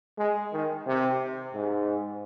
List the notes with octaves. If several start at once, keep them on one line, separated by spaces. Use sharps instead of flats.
G#3
D#3
C3
G#2